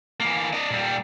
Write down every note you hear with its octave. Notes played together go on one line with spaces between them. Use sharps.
E3 A#3
D4 D#5
A#2 G3